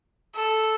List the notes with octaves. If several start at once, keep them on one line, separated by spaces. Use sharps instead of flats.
A4